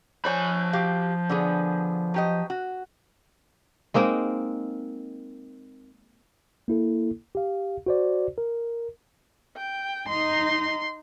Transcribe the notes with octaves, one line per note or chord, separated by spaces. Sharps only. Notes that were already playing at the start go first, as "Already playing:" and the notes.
F3 C5 C#5 G#5 B5
F#4 G4 F5
D3 B3 G#4
F#3 G4 D#5
F#4
G#3 A#3 C4 D#4
A#3 E4 A4
G4 F5
F#4 C5 D5
A#4
G5
D#4 C6